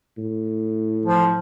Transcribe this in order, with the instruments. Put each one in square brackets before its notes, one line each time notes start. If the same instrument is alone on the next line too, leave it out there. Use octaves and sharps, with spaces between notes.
[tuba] A2
[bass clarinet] F3